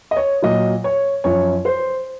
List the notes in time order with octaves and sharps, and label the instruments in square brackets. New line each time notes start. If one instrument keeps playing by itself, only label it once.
[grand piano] D#5
C#5
A#2 F#3 D#5
C#5
F#2 F3 C#5
C5